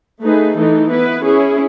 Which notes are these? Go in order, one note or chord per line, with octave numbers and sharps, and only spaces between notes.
A3 D#4 G#4 B4
E3 A3 D#4 A4
B3 E4 B4
C#4 E4 G#4